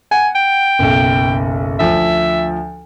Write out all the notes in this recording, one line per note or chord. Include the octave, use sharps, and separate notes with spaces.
F#5 G#5
G5
F#1 B1
D2 F3 E5